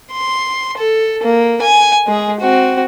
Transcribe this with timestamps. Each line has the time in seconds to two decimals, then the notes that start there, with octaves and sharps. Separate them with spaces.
0.12 C6
0.77 A4
1.23 A#3
1.62 G#5
2.07 G#3 G#4
2.40 C4 F#4